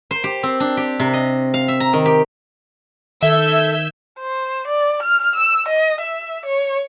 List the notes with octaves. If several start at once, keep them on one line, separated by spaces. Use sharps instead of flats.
C5
G4
C4
D4
G4
C3
D#5
F5
E5
A#5
D#3
G4
D#3 A4 E5 E6 G6 G#6
C5
D5
F6
E6
D#5
E5
C#5